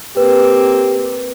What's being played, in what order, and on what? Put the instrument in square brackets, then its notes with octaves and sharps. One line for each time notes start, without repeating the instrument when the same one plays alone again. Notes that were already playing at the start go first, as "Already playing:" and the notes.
[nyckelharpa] A#3 C4 [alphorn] G4 [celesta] B4